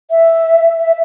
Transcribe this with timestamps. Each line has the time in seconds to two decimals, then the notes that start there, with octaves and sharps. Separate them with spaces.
0.10 E5
0.80 E5